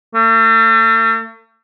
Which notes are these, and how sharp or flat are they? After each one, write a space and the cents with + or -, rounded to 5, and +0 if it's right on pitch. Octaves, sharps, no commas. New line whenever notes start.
A3 +40